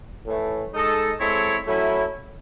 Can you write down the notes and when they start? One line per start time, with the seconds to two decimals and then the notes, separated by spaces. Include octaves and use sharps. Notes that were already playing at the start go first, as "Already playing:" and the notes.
0.26 A2 E3 A3
0.73 G#3 D#4 A4 D#5
1.20 G#3 C4 E4 A4 C#5
1.67 F#3 A3 C#4 E4